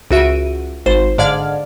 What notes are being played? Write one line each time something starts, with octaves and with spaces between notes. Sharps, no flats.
C#2 F#4 E5 D7 D#7
G#1 C5
G#2 D3 D5 F5 F6 G#6